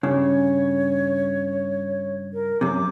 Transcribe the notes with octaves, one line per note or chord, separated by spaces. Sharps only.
G2 C#3 C#5
A#4
F#2 C3 D6